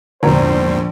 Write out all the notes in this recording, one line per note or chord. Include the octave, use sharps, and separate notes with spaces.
A#1 E2 G#2 D3 C5